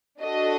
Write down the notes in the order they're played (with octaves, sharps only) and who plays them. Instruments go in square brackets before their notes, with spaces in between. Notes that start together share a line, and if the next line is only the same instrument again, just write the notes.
[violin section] D4 F#4 A4 D#5